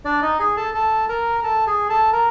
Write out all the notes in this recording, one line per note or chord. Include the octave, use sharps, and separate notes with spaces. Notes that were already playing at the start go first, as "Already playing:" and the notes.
D4 D5
D#4 D#5
G#4 G#5
A4 A5
A4 A5
A#4 A#5
A#5
A4 A5
G#4 G#5
A4 A5
A#4 A#5